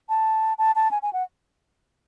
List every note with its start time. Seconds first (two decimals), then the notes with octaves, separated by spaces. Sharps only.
0.09 A5
0.58 A5
0.76 A5
0.91 G#5
1.02 G#5
1.13 F#5